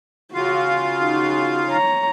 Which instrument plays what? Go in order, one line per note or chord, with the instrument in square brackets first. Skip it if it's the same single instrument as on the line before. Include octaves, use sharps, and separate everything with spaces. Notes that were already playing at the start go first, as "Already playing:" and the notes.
[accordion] C#3 F4 F5 [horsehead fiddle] F#4
[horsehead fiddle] D#4 F#4
C#5 A#5